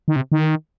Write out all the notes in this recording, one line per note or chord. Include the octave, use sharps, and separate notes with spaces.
D#3
C3
D#3